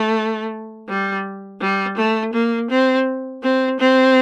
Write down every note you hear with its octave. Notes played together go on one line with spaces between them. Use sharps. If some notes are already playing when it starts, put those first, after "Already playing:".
Already playing: A3
G3
G3
A3
A#3
C4
C4
C4